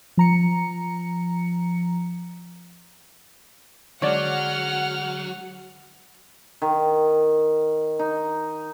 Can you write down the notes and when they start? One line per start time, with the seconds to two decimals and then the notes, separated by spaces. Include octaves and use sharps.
0.17 F3 A#5 C#7
4.02 D3 F#3 G#3 C#5 D5 F#5 F6
6.62 D#3
7.99 D#4